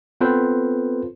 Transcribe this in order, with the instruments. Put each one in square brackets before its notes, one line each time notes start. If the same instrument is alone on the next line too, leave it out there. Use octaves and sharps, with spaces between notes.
[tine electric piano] B3 C4 F4 A4 B4 C5